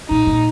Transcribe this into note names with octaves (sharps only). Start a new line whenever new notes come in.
A#2 D#4
A#2